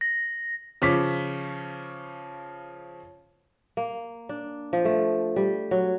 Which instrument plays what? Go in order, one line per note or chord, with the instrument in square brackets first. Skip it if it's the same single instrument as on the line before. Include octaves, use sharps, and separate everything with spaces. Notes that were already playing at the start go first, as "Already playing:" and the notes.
[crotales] A#6
[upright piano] C#3 F3 C#4 C#6 D6 B6
[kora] A#3
D4
F3
A3
G3
F#3